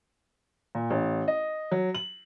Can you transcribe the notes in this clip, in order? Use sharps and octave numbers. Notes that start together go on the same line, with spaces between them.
A#2
A1
D#5
F#3
F#7